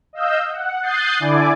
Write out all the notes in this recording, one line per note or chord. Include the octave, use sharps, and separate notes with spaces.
D#5 F5 E6 G6
F#5
D#6 F#6 G6 A6 C7
D3 E4 D5 G#5 D6